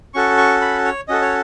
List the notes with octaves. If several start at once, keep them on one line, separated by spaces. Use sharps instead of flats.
C#4 F#4 A4 C#6
C#6
B5
C#5
C#4 F#4 A4 D#5
C#5